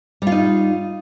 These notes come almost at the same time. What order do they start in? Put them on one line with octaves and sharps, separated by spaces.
G3 F4 D#4